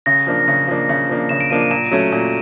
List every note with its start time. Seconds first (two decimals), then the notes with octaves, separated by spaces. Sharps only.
0.06 C#3 A#6
0.27 F3 A#3 D4
0.48 C#3
0.67 F3 A#3 D4
0.89 C#3
1.09 F3 A#3 D4
1.29 C#3 E7
1.41 D7
1.50 F3 A#3 D4 D#7
1.61 D#7
1.71 A#2 E7
1.91 F#3 A3 C#4
2.12 A#2